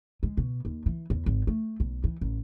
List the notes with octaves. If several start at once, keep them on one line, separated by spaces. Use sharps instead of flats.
G#3
B2
D#2
E3
E2
G#1
A3
B1
E3
A1